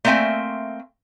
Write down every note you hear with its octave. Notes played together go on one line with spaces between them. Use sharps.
A3 A#3 C4 E5 G#5